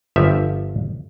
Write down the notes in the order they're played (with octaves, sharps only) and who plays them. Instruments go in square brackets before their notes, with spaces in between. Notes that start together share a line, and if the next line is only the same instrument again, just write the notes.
[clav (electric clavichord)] G1 F3 E5